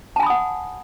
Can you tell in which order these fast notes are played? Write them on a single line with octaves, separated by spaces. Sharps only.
A5 G#5 B5 D#6 F#5